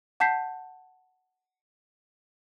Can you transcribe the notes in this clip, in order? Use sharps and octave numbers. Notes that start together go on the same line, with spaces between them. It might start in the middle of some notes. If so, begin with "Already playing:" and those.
F#5 A5 G6 B6 C7